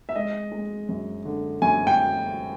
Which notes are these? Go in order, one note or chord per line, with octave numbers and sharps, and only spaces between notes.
E5
G#3 D#5
G#3
F#2
D3
F#2 G#5
G5